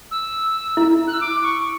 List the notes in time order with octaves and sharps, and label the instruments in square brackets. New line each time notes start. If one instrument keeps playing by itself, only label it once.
[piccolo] E6
[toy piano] E4
[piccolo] F#6
E6
D6
C#6